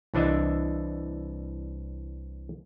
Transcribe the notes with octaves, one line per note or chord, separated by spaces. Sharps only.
C2 E3 D4 D#5 E5